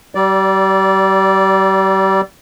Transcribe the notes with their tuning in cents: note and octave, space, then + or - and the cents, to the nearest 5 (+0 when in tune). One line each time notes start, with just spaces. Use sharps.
G3 -35 D5 -10